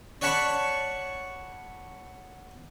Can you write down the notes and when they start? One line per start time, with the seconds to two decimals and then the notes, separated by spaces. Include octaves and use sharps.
0.21 C#5 D5 F#5 A5 B5 C#6